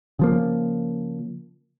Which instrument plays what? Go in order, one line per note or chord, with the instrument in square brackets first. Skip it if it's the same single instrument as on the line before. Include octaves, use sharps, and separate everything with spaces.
[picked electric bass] C#3 F3 A#3